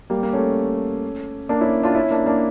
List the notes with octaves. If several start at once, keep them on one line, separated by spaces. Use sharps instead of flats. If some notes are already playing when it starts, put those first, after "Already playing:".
G3 A#3
A#3
A3 C#4
A#3 D4
C#4 E4
D4 F4
C#4 E4
A#3 D4
A#3 D4